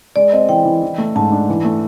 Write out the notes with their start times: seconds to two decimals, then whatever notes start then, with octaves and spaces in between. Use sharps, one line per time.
0.16 G#3 D5
0.32 C4 D#5
0.49 E3 G5
0.65 E3
0.83 E3
0.98 A3
1.16 G#2 A5
1.32 D4
1.49 E3
1.64 A3